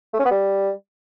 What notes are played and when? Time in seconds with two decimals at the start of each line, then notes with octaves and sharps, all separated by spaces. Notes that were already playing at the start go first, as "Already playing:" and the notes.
0.14 A3
0.19 C#4
0.25 B3
0.31 G3